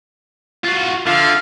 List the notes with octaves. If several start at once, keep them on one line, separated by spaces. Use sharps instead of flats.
F4 F#4
D3 F4 E5 F5